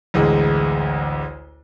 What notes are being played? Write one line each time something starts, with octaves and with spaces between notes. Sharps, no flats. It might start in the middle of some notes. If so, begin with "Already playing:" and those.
A1 D2 G#3